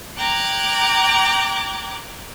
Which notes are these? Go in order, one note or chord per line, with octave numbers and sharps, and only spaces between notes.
G5 A#5 D6 F#6 G#6